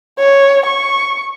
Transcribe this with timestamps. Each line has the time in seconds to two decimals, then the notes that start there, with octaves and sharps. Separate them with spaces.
0.19 C#5
0.67 C#6